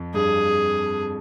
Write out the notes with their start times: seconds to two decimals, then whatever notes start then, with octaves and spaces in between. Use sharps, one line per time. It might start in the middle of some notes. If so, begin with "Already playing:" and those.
Already playing: F2
0.14 G2 G#4